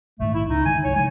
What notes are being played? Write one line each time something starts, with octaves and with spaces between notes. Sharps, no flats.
A#1 G#2 D#3 A3
E4
C#2 C#3 D#4
D3 D#3 G#3 G#5
C2 G2 C#5
C#3 F3 G#3 G#5